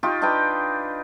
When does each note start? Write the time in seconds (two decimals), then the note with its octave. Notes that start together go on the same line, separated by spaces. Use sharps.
0.03 D#4 F4 G4 C#6
0.22 D4 D#4 B4 G5